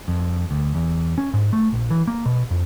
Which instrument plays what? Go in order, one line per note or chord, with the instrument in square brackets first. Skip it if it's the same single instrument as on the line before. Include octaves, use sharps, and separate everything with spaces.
[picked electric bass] F2
D2
E2
C#4
G#2
A3
A#1
E3
A#3
B2
F2